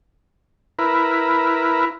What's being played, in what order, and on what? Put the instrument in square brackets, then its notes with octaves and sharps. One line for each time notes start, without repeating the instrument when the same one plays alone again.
[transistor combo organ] E4 A#4 B4